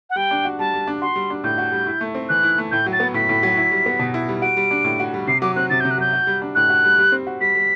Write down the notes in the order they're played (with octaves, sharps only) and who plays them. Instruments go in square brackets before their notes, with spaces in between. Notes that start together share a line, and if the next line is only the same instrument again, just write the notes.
[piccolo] F#5
[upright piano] G3 [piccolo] G5
[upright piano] D4
F#4
[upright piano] G3 [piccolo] A5
[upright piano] G3
D4
[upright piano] F#4 [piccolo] C6
[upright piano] G3
D4
[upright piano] A2 [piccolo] G6
[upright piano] F#4
G3
E4
A3
C4
[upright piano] E3 [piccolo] F#6
[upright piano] E4
A3
[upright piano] A2 [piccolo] G6
[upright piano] F#3
[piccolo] A6
[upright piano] B3
[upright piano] A2 [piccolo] B6
[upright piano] A2
F#3
E4
G3
B3
B2
E4
G3
[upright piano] F#4 [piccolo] D7
[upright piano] G3
D4
A2
F#4
G3
[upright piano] C3 [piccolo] C7
[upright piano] F#3 [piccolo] D6
[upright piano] C4 [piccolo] F#6
[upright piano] C3 [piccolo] A6
[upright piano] C3 [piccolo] G6
[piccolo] F#6
[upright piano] F#3 [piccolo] G6
[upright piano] F#4
G3
D4
[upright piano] A2 [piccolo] F#6
[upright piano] F#4
G3
G3
C4
F#4
[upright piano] G3 [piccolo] B6
[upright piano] G3